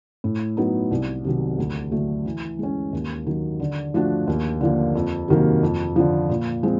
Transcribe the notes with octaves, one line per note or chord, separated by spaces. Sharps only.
A2
F#3 B3 D#4
C2
C3 D#3 F#3
D2
D3 F#3 A3
E3
G#3 C#4
D#2
D#3 F#3
D3
F3 A3 D4 F#4
D#2
D3 F3 A#3
F2
C3 D#3 F#3 A#3
F2
D3 F3
A#2
F3 G#3 C4